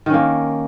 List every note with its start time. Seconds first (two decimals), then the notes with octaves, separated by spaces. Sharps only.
0.06 D#3
0.10 C#4
0.14 A#3